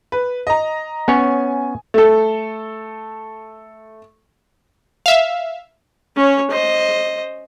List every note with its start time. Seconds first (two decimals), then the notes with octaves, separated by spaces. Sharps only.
0.12 B4
0.47 D#5 A#5
1.08 B3 C#4 C#5 G#5
1.94 A3 A4
5.06 E5 F5
6.16 C#4 C#5
6.51 C5 D#5